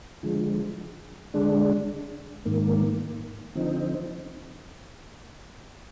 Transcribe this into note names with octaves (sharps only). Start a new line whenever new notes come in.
D3 F3 G#3
D3 G#3 D4
G#2 D#3 A#3
D3 F3 C4 D#4